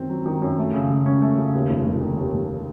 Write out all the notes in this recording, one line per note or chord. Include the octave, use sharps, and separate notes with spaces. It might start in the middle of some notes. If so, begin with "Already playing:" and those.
Already playing: F#2 D#3 C4
F#3
D#3
F#2
A3
C#3
C#3
C#4
A3
C#3
D#2
F1
F1
D#3
D#2
F1